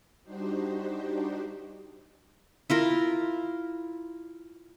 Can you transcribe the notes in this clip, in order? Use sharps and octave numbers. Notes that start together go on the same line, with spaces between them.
G3 D4 D#4 F#4 G4 C5
E4 F4 A#4